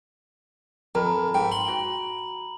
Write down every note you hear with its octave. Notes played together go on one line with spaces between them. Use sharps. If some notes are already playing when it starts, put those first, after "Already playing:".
F2 A#4 A#5 B5
G#2 G5
C6 F#7
F#4 G5